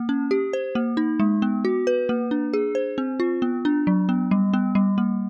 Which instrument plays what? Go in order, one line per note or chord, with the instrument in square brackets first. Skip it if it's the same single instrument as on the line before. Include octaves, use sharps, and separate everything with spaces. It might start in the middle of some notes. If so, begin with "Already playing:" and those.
Already playing: [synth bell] A#3
C#4
G4
C5
A#3
D#4
G#3
B3
F#4
B4
A#3
D4
G#4
C5
C4
F4
B3
D4
F#3
B3
G3
B3
G3
A#3